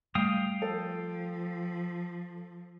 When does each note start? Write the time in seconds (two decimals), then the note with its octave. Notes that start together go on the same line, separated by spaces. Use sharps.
0.15 G3 A3 F5 G5 D#6
0.62 F3 A4